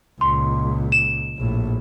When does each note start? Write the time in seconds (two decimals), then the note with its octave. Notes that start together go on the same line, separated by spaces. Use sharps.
0.21 C#2 A#2 C6
0.92 E7
1.38 A#1 A2